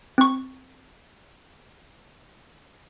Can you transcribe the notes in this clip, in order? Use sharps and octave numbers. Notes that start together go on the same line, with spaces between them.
C4 C#6